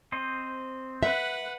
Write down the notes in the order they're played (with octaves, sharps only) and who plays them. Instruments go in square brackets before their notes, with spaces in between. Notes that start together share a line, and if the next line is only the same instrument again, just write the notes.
[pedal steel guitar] C4 C5 D#5
[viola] B4 F#5 [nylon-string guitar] E5